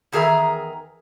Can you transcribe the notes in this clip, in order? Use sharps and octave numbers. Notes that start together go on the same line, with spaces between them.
E2 D#3 G#4 A#4 E5 A#5